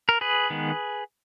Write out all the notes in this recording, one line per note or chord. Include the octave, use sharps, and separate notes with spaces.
A#4
G#4 B4
D#3 G#3 B3